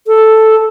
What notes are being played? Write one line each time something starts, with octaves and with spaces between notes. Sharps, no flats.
A4